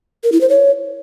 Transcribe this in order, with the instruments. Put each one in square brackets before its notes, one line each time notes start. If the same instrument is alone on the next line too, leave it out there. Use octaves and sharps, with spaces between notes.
[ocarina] A#4
E4
C5
C#5